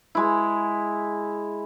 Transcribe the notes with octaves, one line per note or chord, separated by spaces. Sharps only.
G#3 E4